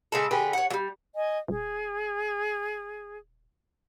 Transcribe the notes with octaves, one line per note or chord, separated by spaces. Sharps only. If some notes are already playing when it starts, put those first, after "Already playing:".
C#3 G#3 A4
D3 G4 G#4 B4
C#5 F#5
F#3 G3
D#5 G#5
D#1 G#4